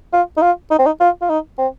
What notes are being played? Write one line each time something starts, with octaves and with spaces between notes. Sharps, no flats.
F4
D#4
F4
D#4
C4
D#4
F4
F4
D#4
C4